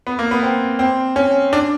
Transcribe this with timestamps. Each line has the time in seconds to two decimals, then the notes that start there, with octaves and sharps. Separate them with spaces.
0.07 B3
0.19 A#3
0.31 B3
0.43 C4
0.79 C4
1.16 C#4
1.53 D4